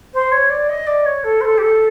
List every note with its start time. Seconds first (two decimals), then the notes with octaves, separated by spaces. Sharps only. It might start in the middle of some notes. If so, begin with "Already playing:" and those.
0.14 C5
0.32 C#5
0.50 D5
0.69 D#5
0.87 D5
1.06 C#5
1.24 A4
1.41 C5
1.46 A4
1.58 G4
1.63 A4